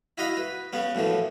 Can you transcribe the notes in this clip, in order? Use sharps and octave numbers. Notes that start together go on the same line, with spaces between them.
E4 F#4 D#5 F5 B5
B4
C#3 B3 C#4
F#2 A2 E3 F3